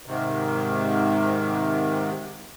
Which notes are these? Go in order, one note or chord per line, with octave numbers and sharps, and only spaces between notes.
G#2 C3 D#3